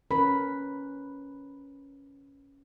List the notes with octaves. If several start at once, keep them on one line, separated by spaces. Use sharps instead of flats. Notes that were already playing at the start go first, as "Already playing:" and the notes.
C#4 A#4 B4 B5